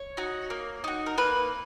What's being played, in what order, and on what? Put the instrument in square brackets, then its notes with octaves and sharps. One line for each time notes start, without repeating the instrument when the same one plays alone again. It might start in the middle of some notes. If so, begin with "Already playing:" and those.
Already playing: [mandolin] C#5
D#4 F#4
A#3
D#4 F#4
A#4
A#3 B4